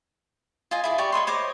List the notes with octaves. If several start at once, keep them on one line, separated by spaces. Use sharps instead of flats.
F4 D#5 G#5
E4 G#4 D5
G4 D5 C#6
C#5 D#5 B5 C6
C5 C#5 D#5 D6